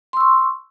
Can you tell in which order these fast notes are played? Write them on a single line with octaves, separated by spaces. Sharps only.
C6 E6 C#6